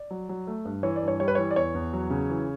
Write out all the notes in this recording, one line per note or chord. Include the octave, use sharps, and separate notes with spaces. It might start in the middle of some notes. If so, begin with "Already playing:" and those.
Already playing: D5
F#3
F#3
A3
G2
E3 C#5
D5
G2
C#5
G3 C#5
B4
E3 C#5
D5
E2 C#5
E2
F#3
C#3
E3